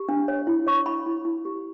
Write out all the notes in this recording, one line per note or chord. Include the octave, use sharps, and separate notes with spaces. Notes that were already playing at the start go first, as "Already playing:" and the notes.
Already playing: G4
D4
C#5
E4
C#5 C#6
E4 B5
E4
E4
G4